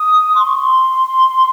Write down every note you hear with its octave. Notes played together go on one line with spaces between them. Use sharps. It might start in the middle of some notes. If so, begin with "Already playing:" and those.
Already playing: D#6
C6
C#6
C6